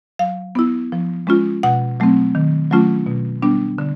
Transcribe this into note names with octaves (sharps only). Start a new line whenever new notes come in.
F#3 F5
B3 E4
F3
G#3 C#4 F4
B2 F#5
F#3 A3 C4
D#3
F#3 A3 C#4 F4
B2
G3 B3 D4
D3